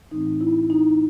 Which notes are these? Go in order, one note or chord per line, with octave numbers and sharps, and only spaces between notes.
A2 E3 A3 C4 D#4
E4
D#4